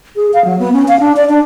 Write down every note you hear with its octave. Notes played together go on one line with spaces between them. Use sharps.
G#4
F5
F#3
B3
C#4
F5
D4
D5
D4